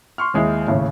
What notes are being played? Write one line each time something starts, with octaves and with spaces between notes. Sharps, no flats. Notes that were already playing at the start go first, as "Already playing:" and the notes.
C6 C#6 F6
D#2 G#3 E4
D#2 A2 C#3